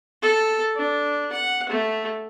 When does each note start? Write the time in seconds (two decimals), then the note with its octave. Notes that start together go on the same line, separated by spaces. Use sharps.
0.22 A4
0.76 D4
1.32 F#5
1.70 A3